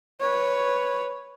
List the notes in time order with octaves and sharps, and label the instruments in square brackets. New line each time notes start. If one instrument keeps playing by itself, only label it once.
[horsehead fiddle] B4 C#5